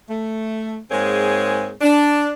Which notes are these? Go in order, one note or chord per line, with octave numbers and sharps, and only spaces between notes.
A3
G#2 G#3 A#3 C4 G#4 C#5
D4